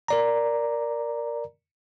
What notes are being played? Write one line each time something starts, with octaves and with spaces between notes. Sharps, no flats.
A#4 D5 A#5